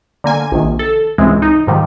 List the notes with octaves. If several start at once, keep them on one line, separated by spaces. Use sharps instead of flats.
D3 A#3 G#5
A#1 C3 D#3
A4
C#2 G#2 C3 E3 G#3 C4
D#4
G#2 D#3 F3 G3